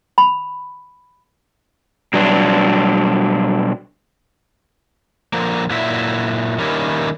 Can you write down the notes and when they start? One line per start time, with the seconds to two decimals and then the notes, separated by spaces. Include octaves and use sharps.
0.18 B5
2.14 B2 F#3 G3 D4
5.33 D3 F3 A#3
5.70 A#2 F#3 E4 E5
6.59 D#3 G3 A#3 C#4 E4